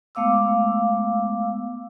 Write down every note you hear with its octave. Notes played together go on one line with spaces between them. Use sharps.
G#3 A3 B3 F5 D6 E6